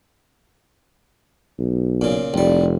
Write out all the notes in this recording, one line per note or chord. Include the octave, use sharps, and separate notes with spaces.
B1
A#2 C#3
F1 C2 G3